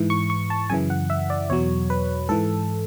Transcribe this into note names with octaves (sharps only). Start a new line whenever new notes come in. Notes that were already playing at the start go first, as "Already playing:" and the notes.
Already playing: G#2 E3
C#6
C#6
A5
F#2 C#3 E3 G#5
F#5
E5
D5
E2 B2 F#3 C#5
B4
G#2 E3 A4